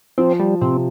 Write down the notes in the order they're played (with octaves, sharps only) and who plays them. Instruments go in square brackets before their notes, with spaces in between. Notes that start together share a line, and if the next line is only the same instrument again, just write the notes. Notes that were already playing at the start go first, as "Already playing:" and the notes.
[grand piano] F3 [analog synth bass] C4
[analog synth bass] G3
[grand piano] C3 [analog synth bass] C4